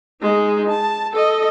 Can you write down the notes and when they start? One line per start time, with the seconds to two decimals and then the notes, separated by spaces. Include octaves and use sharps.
0.22 G#3 D#4
0.68 A5
1.13 A4 D#5